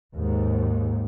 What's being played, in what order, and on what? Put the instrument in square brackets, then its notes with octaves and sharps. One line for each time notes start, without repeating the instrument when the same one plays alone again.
[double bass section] D#2 G#2